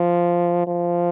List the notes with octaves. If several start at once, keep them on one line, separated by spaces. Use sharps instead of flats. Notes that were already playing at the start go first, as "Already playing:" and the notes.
Already playing: F3
F3